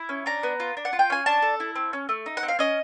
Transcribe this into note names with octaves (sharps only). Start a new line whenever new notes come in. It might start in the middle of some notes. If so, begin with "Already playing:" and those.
Already playing: E4
C#4
D4 A#5
B3
F4
D4
F#5
F4
G5
C#4 G#5
D4 A5
A4
E4
C4
C#4
A3
D#4
F#5
C4
F5
C#4 D#5